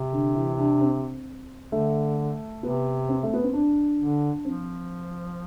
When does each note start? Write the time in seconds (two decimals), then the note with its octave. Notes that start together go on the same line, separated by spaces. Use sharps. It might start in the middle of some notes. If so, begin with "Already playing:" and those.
Already playing: C3
0.12 D3
0.35 E3
0.58 D4
0.81 C4
1.72 D3 A3
2.62 C3 B3
3.09 C4
3.23 A3
3.33 B3
3.44 C4
3.53 D4
3.99 D3
4.45 F3 C4